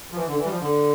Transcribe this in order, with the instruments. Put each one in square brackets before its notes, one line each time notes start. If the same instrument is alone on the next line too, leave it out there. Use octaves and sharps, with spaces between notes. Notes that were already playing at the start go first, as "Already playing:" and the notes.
[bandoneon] F3
E3
D3
E3
G3
F3
D3